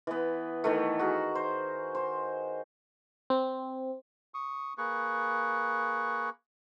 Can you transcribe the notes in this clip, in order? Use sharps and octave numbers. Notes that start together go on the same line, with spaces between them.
E3 B3
D#3 E3 A3
F#4 G#4 A#4
C5
C5
C4
C#6 D#6
A#3 G#4 B4 C#6